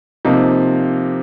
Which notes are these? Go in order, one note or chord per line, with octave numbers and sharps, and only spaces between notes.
C3 F3 A#3 D#4